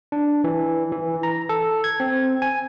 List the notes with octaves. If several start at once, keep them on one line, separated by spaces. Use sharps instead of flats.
D4
E3
E3
A#5
A4
G#6
C4
G#5